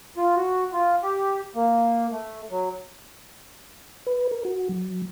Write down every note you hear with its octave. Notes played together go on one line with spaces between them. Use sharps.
F4
F#4
F4
G4
A#3
A3
F#3
B4
A#4
F#4
F#3